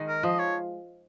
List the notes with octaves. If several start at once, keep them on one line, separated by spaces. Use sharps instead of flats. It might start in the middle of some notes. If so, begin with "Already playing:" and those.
Already playing: D#3 G#3
A#4
F3 D#5
C#5